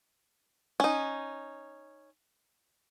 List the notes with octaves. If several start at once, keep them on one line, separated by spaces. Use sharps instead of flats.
C#4 D#4